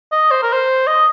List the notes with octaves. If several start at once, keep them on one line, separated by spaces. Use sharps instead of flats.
D#5
C5
A#4
C5
D#5